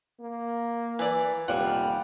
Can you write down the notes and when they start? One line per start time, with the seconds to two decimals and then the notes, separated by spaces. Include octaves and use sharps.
0.20 A#3
0.99 E3 D5
1.48 F1 D#2 G3 F4 F#5